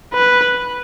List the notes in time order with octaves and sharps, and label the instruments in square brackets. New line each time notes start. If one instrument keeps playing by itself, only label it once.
[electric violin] B4